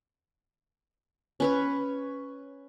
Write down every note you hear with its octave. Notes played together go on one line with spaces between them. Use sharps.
C#4 B4 C#5